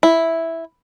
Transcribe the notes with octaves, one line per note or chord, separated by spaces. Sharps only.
E4